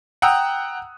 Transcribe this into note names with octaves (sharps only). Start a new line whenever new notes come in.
F#5 G5 A#5 D#6 E6 F#6